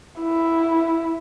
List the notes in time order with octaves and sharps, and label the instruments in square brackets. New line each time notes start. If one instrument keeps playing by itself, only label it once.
[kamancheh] E4